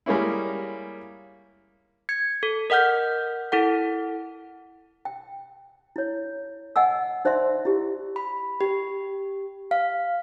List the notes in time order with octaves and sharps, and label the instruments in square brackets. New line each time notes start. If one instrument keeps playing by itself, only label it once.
[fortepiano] G3 G#3 A#3 C#4 E4
[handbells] G#6 C#7
A4
A#4 D#5 F#5 F6 G6
E4 A4 F#5
[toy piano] G5
E4 C#5
D#5 F#5 G#5 E6
D#4 C5 D5 E5 C6
E4 G4
[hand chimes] B5
G4
F5